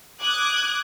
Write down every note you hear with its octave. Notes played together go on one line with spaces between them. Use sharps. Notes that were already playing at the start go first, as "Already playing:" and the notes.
D6 D#6 F#6 G#6